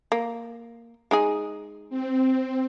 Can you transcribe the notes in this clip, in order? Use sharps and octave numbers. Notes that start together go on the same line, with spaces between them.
A#3
G#3 D#4 G#4
C4